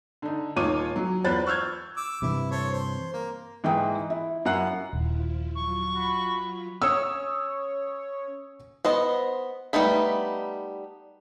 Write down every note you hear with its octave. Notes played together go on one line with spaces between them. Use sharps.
D3 D#4
D#1 D#4 F4 C#5 D6 D#7
F#3
E2 F4 C5 B5 F#6 A6
C#6 E6 F6 G6 G#6
D6 E6
G2 C3 E3 E4
A4 C5 C#5
C5
A#3
G#2 E3 D#4 G5 D#6
E4
F#2 E4 F#5 F#6 C7
D#1 F3 E4 F4
F#3 F4 C#6
F#4 B5
C#4 C#5 D#6 E6
B3 C5 D#5
G3 A3 B3 D#4 B5